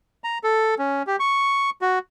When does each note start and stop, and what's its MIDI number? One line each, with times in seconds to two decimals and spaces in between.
0.24 0.38 82
0.44 0.75 69
0.79 1.03 61
1.07 1.16 67
1.20 1.70 85
1.81 1.99 66